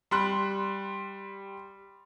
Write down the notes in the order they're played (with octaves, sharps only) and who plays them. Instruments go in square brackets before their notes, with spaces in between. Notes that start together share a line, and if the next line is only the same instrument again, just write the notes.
[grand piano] G3 C6 F#6